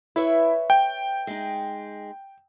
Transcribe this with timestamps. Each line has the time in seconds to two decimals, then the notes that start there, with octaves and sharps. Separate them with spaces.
0.16 E4 B4 C#5 E5
0.70 G5
1.27 G#3 D#4